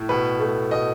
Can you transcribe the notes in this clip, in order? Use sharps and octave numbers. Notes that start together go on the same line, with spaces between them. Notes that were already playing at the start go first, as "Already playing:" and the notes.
Already playing: A2
B2 B4
A3
B2 D#5